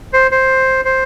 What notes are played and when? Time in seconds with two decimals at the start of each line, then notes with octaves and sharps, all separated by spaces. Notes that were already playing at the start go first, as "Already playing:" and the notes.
0.13 C5
0.31 C5
0.85 C5